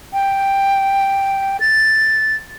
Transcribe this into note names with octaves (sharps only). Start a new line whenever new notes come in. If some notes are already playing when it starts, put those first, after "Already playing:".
G5
A6